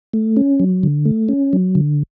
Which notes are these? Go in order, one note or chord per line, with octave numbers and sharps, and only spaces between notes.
A3
C#4
F#3
D3
A3
C#4
F#3
D3